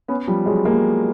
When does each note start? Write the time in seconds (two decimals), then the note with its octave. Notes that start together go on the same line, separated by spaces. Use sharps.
0.08 B3 C#4
0.27 F3 G3
0.46 F#3 G#3
0.65 G#3 A#3